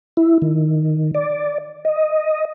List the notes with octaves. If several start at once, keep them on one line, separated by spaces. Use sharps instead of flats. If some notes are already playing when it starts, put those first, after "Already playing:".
E4
D#3
D5
D#5